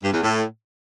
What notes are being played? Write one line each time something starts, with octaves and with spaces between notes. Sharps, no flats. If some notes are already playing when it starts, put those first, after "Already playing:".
G2
E2
A2